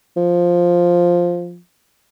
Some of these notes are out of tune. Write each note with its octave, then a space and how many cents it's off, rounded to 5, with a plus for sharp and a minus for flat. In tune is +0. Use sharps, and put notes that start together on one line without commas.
F3 +5